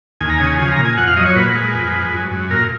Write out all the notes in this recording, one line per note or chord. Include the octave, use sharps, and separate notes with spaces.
D#2 G#5
A#5
C#3 G#5
F3 G#5
A#5
A#2
G#5
F2 F#5
F5
F#3 D#5
C#5
A#2 B4
G#3
F2
G#3
F#2
F#2
A#2 A#4